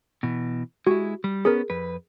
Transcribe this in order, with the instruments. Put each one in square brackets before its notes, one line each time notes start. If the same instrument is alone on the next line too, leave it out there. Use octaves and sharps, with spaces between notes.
[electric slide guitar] B2 E3
[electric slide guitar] G#3 E4 [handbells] F#4 G4 C#6
[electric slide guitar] G3
[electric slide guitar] B3 C#4 [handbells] G#4 A#4
[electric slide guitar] F2 B4